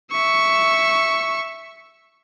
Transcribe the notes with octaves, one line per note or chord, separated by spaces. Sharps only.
E5 C#6